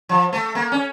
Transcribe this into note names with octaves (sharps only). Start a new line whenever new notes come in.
F3
A3
A#3
C#4